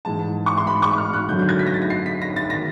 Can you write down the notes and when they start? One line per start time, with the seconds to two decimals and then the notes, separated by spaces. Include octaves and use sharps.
0.05 G#2 E3 G#3 A5
0.46 C#6
0.57 C6
0.67 B5
0.82 C#6
0.98 F6
1.13 F#6
1.29 F#2 D3 F#3 G6
1.39 G6
1.49 G#6
1.59 B6
1.67 A#6
1.74 A6
1.82 A#6
1.90 C7
2.06 B6
2.22 A#6
2.36 A6
2.50 D#3 A#6